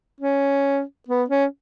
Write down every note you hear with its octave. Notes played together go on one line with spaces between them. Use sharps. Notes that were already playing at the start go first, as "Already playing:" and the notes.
C#4
B3
C#4